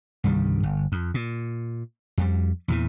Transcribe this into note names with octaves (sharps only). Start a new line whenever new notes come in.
C2 G2 D#3 G3
G1
F2
A#2
F2 G3
E2 A#2 E3